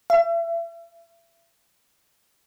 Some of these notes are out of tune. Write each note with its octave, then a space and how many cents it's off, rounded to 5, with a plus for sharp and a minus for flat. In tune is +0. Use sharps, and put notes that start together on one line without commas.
E5 +35